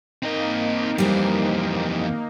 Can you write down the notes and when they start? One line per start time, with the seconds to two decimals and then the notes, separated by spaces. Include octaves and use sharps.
0.23 A#3 C4 D#4 D#5
0.98 F2 E3 G3 C5